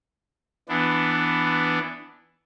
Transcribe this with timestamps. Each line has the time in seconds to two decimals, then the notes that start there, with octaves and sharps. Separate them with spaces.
0.69 E3 B3 D4